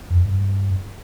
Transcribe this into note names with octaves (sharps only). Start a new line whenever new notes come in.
F2
G2